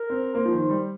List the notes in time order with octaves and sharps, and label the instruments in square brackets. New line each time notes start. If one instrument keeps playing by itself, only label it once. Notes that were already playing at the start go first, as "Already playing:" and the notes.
Already playing: [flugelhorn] A#4
[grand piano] C4
[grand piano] A#3 [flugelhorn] C5
[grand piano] F3
D#3
G3